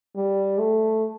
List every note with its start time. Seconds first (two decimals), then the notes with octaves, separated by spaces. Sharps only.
0.16 G3
0.59 A3